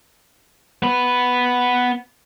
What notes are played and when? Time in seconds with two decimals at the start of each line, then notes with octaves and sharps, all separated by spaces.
0.82 B3 B4